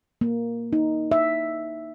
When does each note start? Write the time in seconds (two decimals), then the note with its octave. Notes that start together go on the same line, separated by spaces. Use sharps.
0.21 A#3
0.73 D#4
1.11 E5